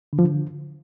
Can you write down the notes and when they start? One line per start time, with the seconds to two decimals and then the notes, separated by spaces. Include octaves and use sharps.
0.13 D3
0.19 F3
0.25 D3